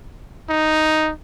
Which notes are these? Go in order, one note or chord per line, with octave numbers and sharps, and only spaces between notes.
D#4